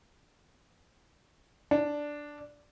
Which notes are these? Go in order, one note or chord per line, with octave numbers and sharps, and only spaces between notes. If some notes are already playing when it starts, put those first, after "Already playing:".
D4